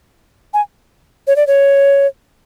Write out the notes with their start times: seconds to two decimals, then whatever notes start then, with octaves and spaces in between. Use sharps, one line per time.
0.54 G#5
1.27 C#5
1.36 D5
1.47 C#5